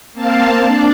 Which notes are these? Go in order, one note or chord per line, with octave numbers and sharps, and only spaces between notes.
A#3 C4 F5 A5
D4 D5